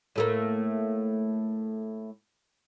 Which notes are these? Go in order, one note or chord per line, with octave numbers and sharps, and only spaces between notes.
A2 A3 A#3